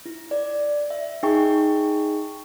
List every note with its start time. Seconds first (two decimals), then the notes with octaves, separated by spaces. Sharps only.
0.06 E4
0.31 D5
0.90 E5
1.23 D#4 G#4 G5 G#5 C#6